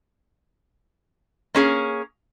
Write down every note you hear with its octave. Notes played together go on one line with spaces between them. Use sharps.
A#3 C#4 G#4